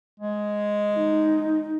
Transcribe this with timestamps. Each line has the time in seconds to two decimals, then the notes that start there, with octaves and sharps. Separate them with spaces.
0.20 G#3
0.96 D#4